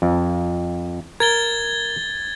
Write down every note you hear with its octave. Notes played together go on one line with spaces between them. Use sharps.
F2
A#4 G#6 A6 G7